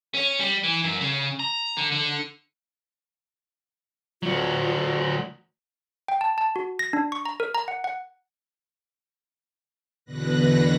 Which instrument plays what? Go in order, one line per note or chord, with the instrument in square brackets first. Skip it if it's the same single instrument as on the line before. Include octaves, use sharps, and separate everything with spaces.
[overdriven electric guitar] C#4
G3
E3
F#2
C#3
A#5
D3
D3
[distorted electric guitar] D2 F#3 [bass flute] F4
[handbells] G5
A5
A5
F#4
A#6
D4
C#6
A#5
A#4
A#5
F#5
F#5
[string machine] E2 B2 D3 B4 F#6 A#6